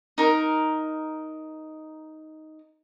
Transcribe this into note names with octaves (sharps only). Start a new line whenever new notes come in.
D#4 A#4